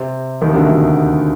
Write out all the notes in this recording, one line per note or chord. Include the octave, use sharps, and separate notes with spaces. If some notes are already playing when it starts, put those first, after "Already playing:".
Already playing: C3 C4
D#2 D#3
C3
D2 D3
D2 D3